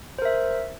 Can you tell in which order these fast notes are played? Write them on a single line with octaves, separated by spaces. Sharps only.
C5 A#4 E5